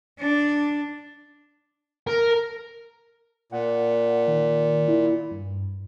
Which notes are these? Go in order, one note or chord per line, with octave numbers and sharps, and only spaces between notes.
D4
A#4
A#2 F#5
D#3
E4
G2